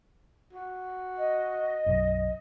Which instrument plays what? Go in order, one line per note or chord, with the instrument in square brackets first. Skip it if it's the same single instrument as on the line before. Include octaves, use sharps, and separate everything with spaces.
[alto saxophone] F#4
[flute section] D#5
[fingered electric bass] B1 F#2